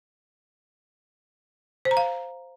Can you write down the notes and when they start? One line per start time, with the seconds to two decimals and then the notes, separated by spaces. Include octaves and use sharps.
1.85 C5
1.91 A#5
1.97 F5